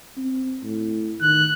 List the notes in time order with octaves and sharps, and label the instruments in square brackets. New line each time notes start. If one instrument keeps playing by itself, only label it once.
[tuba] C4
A2
[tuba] D#3 [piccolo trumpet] F#6